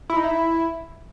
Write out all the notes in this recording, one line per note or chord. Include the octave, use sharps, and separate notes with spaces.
E4
D#4
E4